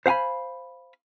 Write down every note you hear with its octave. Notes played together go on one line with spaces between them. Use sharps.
C5 F5 F#5 G#5 B5